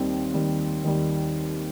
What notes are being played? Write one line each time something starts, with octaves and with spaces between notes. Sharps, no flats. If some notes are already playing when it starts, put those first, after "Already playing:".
Already playing: D#2 D#3 G3 C4
D#2 D#3 G3
D#2 D#3 G3